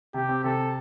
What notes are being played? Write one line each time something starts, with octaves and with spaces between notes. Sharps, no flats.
C3 G4
C4
C3 A4